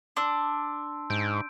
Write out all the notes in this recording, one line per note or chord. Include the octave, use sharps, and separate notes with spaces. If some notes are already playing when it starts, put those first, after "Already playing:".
D4 C6 E6
G#2 G6 D7